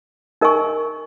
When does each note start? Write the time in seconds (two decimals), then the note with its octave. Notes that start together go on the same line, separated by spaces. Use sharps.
0.41 D#4 A#4 D#5 G#5 C#6